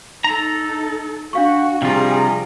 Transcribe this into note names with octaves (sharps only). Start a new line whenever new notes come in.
D#4 A4 A#5
D4 F#4 F5 C#6
C3 F3 G3 F4 G#4 A#5